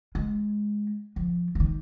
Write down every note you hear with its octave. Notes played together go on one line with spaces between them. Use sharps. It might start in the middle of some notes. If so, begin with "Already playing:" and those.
G#3
F3
F3
D#3